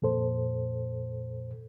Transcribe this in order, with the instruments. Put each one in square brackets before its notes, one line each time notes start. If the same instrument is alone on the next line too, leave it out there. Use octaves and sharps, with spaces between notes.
[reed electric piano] F2 A#2 A4 C5